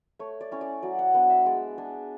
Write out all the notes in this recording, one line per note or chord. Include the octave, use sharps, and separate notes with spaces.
A3 C#5
D5
C#4 E4
D5
F#3 D5
F#5
B3 D4 F#5
E5
G#3 D5
D4 G#4